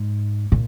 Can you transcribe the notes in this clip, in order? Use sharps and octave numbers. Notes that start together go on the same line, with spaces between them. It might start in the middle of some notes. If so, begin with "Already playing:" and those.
Already playing: G#2
A#2